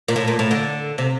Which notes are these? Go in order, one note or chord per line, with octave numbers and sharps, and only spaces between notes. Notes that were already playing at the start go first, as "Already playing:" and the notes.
A#2
A2
A#2
A2
D3
C3